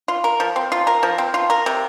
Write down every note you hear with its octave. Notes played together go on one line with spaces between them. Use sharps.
F4
A#4
F3
C4
F4
A#4
F3
C4
F4
A#4
C3